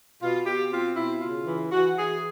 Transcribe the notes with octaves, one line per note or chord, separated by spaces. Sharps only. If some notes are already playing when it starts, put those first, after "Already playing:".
B2 F4
B2 G4
C4 F4
B2 E4
C#3 F4
E3
E3 F#4
E3 G#4